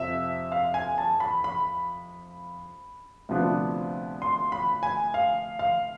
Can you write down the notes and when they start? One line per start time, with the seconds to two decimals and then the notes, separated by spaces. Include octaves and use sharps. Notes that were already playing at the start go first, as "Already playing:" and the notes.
Already playing: F2 C3 F3 E5
0.52 F5
0.74 G#5
0.98 A5
1.20 B5
1.44 B5
3.29 D2 C3 F3 B3 D4
4.22 C6
4.52 B5
4.83 G#5
5.14 F5
5.59 F5